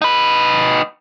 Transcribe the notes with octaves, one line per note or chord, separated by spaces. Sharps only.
D#4 B4